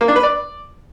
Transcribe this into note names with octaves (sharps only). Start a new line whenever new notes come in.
A#3
D4
B4
D5